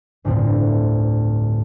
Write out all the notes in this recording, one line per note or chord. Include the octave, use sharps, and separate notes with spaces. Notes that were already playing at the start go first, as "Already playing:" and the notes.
G1 D2 A2 C4